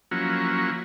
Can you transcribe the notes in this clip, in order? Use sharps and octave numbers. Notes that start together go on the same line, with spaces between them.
F3 F#3 A#3 C#4 E4 F#4